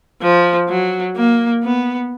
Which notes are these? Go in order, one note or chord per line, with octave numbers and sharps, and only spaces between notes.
F3
F#3
A#3
B3